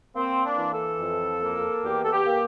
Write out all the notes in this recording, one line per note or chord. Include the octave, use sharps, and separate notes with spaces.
A#3 C4
D4
E3
A4
F2
A#3
E2 G4
A4
G4
A#3